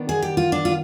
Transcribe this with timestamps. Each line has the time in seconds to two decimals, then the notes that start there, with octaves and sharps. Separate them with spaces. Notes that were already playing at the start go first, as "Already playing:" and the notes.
Already playing: D#3 B3 D4
0.09 G#4
0.22 G4
0.37 F4
0.52 D4
0.65 F4